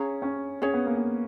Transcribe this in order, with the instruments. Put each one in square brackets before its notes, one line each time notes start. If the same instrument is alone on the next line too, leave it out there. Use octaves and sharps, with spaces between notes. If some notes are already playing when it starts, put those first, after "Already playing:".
Already playing: [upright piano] C#4 [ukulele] G#4 C#5 F5 A#5
[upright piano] C#4
[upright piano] C#4 [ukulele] G#4 C#5 F5
[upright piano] B3
A#3
B3